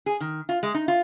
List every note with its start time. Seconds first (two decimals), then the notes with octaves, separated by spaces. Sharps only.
0.06 G#4
0.20 D#3
0.49 F4
0.63 G#3
0.74 D#4
0.88 F4